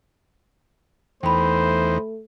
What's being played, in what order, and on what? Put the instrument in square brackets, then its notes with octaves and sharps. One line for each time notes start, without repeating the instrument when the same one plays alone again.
[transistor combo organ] E2 E3 D#4 [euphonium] A3 [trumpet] C5 [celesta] G5 B5